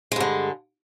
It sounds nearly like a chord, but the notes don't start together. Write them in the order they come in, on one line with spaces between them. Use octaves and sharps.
G#3 G2 D3